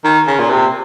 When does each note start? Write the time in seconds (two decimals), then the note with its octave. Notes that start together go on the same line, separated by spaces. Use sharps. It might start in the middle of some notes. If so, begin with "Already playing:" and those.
0.04 D#3
0.27 C#3
0.39 A#2
0.50 C3